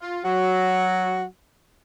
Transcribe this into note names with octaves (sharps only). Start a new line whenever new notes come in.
F4
F#3 F#4